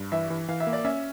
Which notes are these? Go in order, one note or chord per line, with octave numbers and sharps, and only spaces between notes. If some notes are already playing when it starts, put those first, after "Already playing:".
Already playing: G2
E3 E5
E3
E3 F5
E5
A#3
D5
C#4 E5